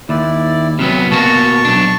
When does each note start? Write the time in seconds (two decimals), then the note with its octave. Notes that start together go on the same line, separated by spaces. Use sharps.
0.09 D#2 E4 D5
0.79 C3 F#3 B3 F6
1.11 B2 A#3 F#4 A5 C#6
1.65 B1 D4